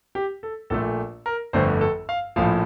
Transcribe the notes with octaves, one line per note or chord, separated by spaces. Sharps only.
G4
A4
A#1 A#2 A3 A4
A#4
G1 F2 D3 A3 C5
A4
F5
A#1 A2 F3 F5